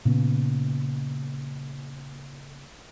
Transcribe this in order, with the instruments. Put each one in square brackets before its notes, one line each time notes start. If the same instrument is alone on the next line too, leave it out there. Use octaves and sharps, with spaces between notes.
[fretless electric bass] A#2 C#3 B3